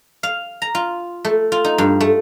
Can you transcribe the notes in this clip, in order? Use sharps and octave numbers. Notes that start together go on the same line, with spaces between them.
F5
A#5
F4
A3
F4
D#4
G2
A3